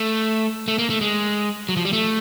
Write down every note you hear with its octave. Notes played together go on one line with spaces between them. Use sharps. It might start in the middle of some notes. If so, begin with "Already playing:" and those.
Already playing: A3
A3
A#3
A3
G#3
F#3
F3
G3
A3